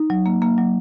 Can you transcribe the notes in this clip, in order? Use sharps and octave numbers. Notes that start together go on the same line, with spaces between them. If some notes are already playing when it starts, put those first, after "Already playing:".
Already playing: D#4
F#3
A#3
A#3
F#3